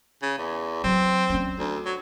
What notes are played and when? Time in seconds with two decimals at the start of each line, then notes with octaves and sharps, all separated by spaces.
0.22 C#3
0.38 E2
0.84 F#3 C4
1.30 C#4 D4
1.59 D2
1.85 F#3